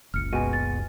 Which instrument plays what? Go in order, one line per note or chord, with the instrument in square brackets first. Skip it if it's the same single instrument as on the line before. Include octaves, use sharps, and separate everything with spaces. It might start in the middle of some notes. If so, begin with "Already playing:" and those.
[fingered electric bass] F#1 C#2 [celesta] F6 C#7
[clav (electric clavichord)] B2 G#3 F#4 [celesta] G#5 D#7
[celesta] A6